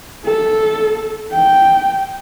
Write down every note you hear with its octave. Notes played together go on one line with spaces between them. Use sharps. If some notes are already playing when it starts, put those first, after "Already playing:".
A4
G5